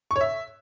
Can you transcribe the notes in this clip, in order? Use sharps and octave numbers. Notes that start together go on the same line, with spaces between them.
C#6
C#5
E5